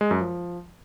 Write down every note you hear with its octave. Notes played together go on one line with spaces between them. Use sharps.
G#3
F#2
F3